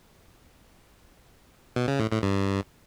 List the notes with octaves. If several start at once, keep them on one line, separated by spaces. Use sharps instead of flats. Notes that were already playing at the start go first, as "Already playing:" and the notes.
B2
C#3
A2
A2
G2